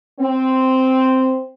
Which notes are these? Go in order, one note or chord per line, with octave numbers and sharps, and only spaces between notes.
C4